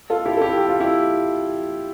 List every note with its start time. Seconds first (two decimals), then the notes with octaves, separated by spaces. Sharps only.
0.10 F4 A4
0.25 E4 G4
0.37 A4
0.41 E4 G4
0.57 G4
0.69 F4
0.80 E4 G4